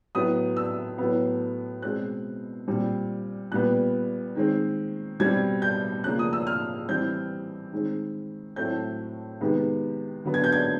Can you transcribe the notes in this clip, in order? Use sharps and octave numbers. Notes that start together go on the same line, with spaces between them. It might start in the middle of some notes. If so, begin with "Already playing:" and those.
A2 F#3 B3 D#6
E6
A2 F#3 B3
B2 G#3 C4 F#6
A#2 G3 C4
A#2 G3 B3 F#6
D#3 G#3 C4
B2 G3 C4 G#6
G6
C#3 F3 A#3 F#6
D#6
E6
F6
E3 G3 C4 G6
D#3 G#3 C4
A2 F#3 A3 C4 G6
C3 D#3 G#3 B3
D3 F#3 B3
G#6
G6
G#6